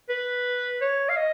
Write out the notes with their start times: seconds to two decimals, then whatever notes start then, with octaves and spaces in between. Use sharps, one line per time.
0.10 B4
0.81 C#5
1.09 F5
1.16 D#5